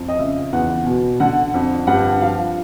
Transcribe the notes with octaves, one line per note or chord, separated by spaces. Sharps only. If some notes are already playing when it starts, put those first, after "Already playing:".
Already playing: F2
D#5
C#3 E5
E2 F#5
B2
D3 F#5
F2
G2 F#5
F3 F5